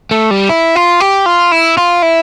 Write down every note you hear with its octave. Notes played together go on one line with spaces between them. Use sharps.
A3
G3
E4
F4
G4
F4
E4
F4
E4